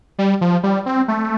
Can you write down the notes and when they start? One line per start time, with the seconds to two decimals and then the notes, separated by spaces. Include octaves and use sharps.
0.19 G3
0.41 F3
0.63 G3
0.86 C4
1.08 A3